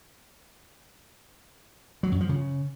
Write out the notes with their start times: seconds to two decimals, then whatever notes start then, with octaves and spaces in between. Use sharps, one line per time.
2.03 F#3
2.12 F#2
2.21 F3
2.29 C#3